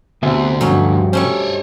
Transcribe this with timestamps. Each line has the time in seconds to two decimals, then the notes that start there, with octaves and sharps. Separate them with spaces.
0.23 D2 C3 B3 E5 G#5
0.61 G2 C3 F3 F#3 C#4 D#4
1.13 G3 A3 C#4 C5 C#5